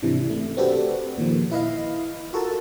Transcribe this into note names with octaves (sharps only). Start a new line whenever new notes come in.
G#2 C3 E3 D4
C#3 A3
C4 D4 F#4 G4 A4 B4
A#2 D#3 F3
E4 B4 D#5 F5
F4 F#4 A4 A#4 A5